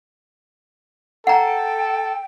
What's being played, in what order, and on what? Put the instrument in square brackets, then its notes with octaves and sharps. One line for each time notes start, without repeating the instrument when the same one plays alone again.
[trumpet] A4 [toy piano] F#5 A#5 [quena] G5